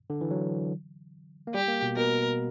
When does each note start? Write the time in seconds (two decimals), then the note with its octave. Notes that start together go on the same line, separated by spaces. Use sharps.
0.10 D3
0.21 E3
0.31 F#3
1.47 A#3
1.54 G3 G4
1.68 A#3
1.82 B2
1.96 B2 A#4